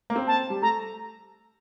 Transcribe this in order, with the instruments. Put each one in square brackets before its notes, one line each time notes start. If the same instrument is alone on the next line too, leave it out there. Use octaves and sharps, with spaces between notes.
[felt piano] A#3
C4
[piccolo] A5
[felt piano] G3
[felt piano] A3 [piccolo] A#5